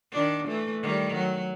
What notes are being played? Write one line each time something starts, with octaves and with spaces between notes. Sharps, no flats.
D#3 D4
E3 A3
D#3 G3
F#3